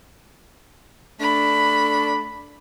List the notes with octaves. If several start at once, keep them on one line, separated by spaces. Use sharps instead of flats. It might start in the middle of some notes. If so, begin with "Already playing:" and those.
A3 D4 B5